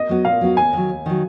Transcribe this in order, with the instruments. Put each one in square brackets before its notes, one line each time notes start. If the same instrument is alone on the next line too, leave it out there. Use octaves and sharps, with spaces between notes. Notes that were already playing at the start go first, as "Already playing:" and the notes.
Already playing: [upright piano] D#5
[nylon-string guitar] F#3 B3 F#4
[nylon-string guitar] A#2 [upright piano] F5
[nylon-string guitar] F#3 B3 F#4
[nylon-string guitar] D#2 [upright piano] G#5
[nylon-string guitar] D#3 F#3
D#2
D#3 F#3